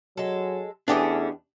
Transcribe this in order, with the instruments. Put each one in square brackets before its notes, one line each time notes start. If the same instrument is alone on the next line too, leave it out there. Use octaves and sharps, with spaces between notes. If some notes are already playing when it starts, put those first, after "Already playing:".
[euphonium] F#3 [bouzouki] G#3 A4
[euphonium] E2 [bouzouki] E3 A3 C#4 [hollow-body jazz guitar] D4 G4 D#5